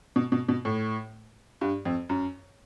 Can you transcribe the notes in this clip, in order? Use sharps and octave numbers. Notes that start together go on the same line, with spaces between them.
B2
B2
B2
A2
G2
F2
F#2